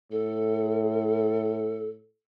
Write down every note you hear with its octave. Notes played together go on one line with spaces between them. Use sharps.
A2 A4